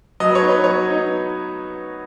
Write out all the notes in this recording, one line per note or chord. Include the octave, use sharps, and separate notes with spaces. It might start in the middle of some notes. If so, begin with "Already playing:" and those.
F#3 D#5
B4
C#5
B3 D#4
B4
F#3 C#5
B3 D#4